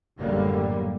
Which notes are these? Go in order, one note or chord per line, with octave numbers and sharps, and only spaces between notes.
F#1 F#2 A2 D3 G3 A#3